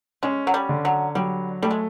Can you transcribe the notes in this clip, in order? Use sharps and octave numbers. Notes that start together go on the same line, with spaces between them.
G#3 C#4
F#3
G3
D3
F#3
F#3 G3
G3 A3
G#3